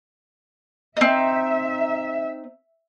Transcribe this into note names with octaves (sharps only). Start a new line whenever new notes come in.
C4 D#4 E5